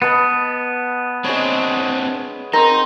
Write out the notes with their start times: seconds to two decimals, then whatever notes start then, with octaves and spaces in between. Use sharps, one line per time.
0.02 B3 B4 D#5 A5
1.24 G#3 C4 D4 C#5
2.53 C4 D#4 A#4 C5 A#5 C6 A#6